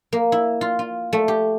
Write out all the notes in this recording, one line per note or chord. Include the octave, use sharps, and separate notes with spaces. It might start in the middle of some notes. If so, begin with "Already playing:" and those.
A#3
E4
F4
F4
A3
G4